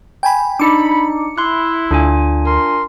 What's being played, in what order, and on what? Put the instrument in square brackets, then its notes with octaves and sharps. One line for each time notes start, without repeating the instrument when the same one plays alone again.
[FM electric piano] G5 G#5 B5
[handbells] D4 D#4 [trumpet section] B5 [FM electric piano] D6 C#7
[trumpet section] E4 [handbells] C6 F#6
[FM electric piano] D2 [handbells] D4 F4 G#5
[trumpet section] A#4 C6